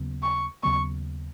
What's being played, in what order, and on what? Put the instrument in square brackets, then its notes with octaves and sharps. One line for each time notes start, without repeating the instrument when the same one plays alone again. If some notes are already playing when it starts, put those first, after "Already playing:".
Already playing: [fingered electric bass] D#2 C#3 F#3 B3
[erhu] C#6
[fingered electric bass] D#2 C#3 F#3 B3 [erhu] C#6